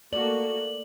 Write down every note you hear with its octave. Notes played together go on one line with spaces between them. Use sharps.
A3 A#3 F#4 D5 F#7